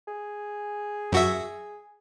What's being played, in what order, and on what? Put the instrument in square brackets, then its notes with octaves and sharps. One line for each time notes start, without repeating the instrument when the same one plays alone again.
[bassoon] G#4
[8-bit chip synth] F#2 F#4 E5